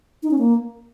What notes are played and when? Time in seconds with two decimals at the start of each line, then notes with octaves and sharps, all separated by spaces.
0.23 D#4
0.31 C#4
0.38 A#3